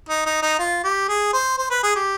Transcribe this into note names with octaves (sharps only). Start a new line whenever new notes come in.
D#4
D#4
D#4
F4
G4
G#4
C5
C5
B4
G#4
G4